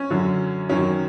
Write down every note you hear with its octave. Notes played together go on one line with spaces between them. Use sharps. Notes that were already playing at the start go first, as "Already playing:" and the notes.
Already playing: C#4
F#2 D3 F#3
F#2 D#3 F#3 C#4